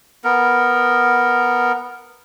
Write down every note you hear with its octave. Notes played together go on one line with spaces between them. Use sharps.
B3 A#4